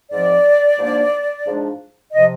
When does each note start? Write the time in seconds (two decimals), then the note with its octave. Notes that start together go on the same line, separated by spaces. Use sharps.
0.11 G#2 F3 C4 D5
0.78 G#2 F3 A#3 D4
1.45 G#2 F3 G#3 D4
2.12 C3 F3 C4 D#5